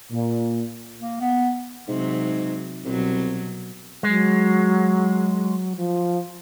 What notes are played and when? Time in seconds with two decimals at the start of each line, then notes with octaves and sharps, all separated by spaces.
0.12 A#2
1.00 A#3
1.21 B3
1.88 G#2 C3 F#3
2.84 C2 B2 F#3
4.03 F#3 G#3
5.76 F3